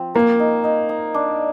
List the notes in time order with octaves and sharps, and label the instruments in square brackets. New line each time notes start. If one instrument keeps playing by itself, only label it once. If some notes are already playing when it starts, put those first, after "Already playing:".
Already playing: [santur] F3 C4
[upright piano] A#3 [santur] A#4
[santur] D#4
D#4
D#4
D4